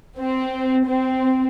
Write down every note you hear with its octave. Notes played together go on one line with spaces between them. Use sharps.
C4
C4